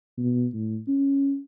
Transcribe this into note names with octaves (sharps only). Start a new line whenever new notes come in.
B2
A2
C#4